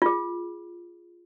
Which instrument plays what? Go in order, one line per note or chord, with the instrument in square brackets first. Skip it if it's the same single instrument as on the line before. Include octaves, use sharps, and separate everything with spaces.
[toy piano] F4 G#4